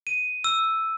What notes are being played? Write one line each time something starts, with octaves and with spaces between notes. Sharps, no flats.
D#7
E6